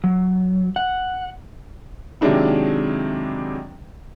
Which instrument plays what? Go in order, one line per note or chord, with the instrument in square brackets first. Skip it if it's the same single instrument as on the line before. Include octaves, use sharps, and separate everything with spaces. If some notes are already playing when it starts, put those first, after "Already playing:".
[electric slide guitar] F#3
F#5
[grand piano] C3 D#3 F#3 G#3 D4 E4